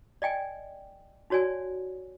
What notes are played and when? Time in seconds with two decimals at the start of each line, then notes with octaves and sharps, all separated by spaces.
0.22 D5 D#5 G5 G#5
1.30 D#4 F#4 C#5 D5 G#5